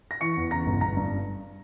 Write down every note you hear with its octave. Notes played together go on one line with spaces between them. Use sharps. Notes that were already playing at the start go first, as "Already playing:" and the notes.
A#6
E3 C#6 C#7
E2
C#3 A#5 A#6
G1
G1 A#5 A#6
G2